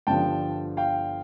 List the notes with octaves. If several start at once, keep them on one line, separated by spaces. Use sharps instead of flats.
G1 G2 D3 F3 G5 A5
F5 G5